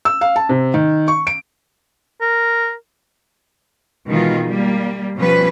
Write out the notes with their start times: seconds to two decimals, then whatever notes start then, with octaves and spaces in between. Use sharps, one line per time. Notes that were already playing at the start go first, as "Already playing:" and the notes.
0.05 E6
0.21 F5
0.36 A5
0.49 C3
0.74 D#3
1.08 C#6
1.27 D7
2.21 A#4
4.07 B2 D#3 E3 G#3 F4
4.46 G3 A#3
5.16 B2 F3 G3 C#4 B4